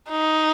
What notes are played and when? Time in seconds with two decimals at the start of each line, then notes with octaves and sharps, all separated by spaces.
0.10 D#4